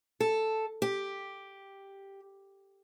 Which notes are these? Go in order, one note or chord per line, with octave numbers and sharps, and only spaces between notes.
A4
G4